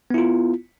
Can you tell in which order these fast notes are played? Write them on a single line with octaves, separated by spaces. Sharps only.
B3 E4 F4